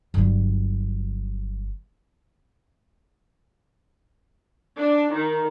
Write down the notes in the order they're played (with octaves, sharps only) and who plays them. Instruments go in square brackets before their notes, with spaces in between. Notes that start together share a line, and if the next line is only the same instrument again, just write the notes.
[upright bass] G1 F#3
[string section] D4
D#3